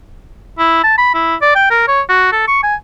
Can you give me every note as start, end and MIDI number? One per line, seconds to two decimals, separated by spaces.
0.59 0.82 64
0.84 0.97 81
0.98 1.12 83
1.14 1.36 64
1.42 1.52 74
1.56 1.68 79
1.70 1.86 70
1.88 2.02 73
2.09 2.28 66
2.32 2.44 69
2.48 2.60 85
2.63 2.75 80